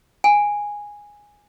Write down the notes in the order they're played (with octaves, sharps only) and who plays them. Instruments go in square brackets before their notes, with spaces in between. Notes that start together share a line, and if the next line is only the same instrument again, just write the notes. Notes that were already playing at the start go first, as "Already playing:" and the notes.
[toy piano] G#5